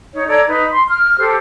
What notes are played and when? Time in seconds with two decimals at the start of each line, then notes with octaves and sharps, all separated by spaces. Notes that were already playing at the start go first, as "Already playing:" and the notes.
0.14 D#4 C#5
0.28 A4 D5 A#5 G#6
0.47 D#4 B4
0.71 C6
0.88 F6
1.18 G4 A4 C5